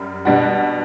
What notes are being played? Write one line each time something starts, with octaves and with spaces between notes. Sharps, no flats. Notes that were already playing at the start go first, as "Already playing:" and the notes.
Already playing: F#2 G3
B2 G3 D4 F#4